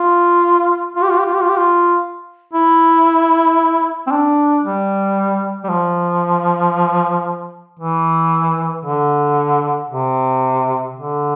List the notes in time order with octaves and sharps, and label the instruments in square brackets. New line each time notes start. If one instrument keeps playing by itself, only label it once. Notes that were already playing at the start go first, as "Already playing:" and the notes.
Already playing: [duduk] F4
F4
G4
F4
G4
F4
G4
F4
G4
F4
E4
C4
D4
G3
G3
F3
E3
D3
C3
D3